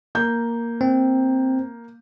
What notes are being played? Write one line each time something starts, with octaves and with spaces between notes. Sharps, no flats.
A#3 G6
C4